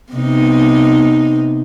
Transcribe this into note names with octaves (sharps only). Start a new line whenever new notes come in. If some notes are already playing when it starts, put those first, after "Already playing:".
C3 B3 D#4